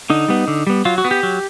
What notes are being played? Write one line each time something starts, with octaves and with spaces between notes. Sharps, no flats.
D3 D#4
G3 B3
D3
G3 B3
F#3 F4
F#4
B3
G4
F#3